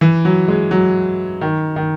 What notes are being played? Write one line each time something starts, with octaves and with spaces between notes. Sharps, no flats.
E3
F#3
G#3
F#3
D#3
D#3